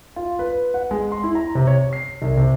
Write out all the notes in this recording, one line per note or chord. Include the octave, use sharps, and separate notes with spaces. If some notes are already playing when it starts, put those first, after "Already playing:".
F4
B4
F#5
G#3
C6
E4
A#5
C3
C#5
C7
C2
C3